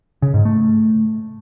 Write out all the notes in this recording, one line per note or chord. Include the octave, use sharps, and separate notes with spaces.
C#3
G#2
A3